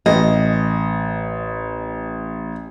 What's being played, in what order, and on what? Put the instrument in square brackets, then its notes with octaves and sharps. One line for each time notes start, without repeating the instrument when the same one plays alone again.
[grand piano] A1 [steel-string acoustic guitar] D#5